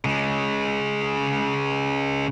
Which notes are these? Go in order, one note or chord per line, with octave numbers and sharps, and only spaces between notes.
C#3 G#3